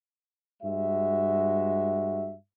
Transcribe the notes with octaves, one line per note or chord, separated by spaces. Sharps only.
G2 G#3 F#4 E5